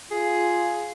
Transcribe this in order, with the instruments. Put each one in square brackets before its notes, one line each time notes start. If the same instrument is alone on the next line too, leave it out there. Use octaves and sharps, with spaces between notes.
[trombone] F4 [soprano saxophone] G#4